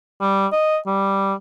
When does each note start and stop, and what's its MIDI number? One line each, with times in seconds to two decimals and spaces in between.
0.21 0.47 55
0.52 0.77 75
0.87 1.34 55